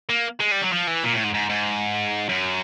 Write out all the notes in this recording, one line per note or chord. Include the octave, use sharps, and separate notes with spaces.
A#3
G#3
G3
F#3
F3
E3
A#2
A2
G#2
G#2
G#2
F#2